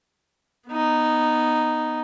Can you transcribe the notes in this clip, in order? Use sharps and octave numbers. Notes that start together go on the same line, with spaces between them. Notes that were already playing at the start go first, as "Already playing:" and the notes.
B3 D#4